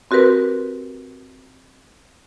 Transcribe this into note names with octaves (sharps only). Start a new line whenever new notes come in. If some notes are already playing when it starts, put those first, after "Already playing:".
C4 F#4 G4 A#4 B4